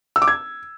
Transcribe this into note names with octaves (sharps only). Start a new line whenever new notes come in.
E6
D6
G#6